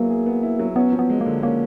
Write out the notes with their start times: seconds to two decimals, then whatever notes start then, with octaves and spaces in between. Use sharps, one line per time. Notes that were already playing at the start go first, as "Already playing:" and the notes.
Already playing: F#3 A#3 B3 E4 G#4
0.10 G#4
0.26 B3
0.43 E4
0.59 F#3
0.76 B3 C#4
0.92 F3
0.99 B3
1.10 G#3
1.21 A#3
1.26 D3
1.43 A#3 C#4